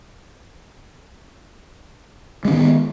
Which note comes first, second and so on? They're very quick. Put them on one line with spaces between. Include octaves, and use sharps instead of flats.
G#3 C#4 D#3 B3